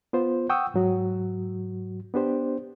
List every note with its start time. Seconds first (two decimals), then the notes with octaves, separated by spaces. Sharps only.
0.13 B3 F4 C5
0.49 F#5 G5 C#6 D#6 E6
0.74 G#2 F#3 F#4
2.14 B3 D4 G4 C5